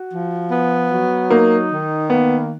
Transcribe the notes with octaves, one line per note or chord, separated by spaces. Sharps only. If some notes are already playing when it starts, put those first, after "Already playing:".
Already playing: F#4
F3
B3
F#3
A#3 D#4
D#3
A#3 B3